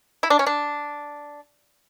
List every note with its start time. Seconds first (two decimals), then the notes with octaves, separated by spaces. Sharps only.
0.23 E4
0.30 D4
0.39 C#4
0.46 D4